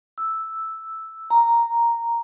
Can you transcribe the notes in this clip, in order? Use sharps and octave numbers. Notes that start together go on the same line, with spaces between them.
E6
A#5